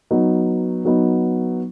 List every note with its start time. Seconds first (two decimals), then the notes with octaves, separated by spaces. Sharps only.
0.11 F#3 B3 D#4
0.85 F#3 B3 D#4